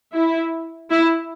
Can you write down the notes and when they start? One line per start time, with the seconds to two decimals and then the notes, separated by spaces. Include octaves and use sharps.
0.15 E4
0.90 E4